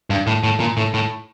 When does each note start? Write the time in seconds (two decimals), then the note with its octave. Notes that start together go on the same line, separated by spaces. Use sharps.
0.10 G2
0.27 A2
0.44 A2
0.60 A#2
0.77 A2
0.94 A2